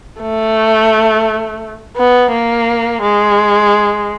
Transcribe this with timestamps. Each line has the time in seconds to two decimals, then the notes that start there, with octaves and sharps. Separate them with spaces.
0.21 A3
1.97 B3
2.32 A#3
3.02 G#3